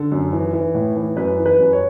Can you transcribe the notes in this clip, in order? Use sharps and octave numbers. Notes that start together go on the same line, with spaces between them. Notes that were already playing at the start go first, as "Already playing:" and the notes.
Already playing: D3 A4
F#2
E3
E3
A2
E3
F#2 B4
E3
B4
F#2
C#5